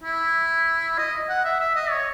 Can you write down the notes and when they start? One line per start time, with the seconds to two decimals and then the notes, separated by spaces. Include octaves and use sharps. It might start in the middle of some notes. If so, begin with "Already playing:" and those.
0.04 E4
0.98 D#5
1.29 F#5
1.45 E5
1.60 E5
1.75 D#5
1.91 C#5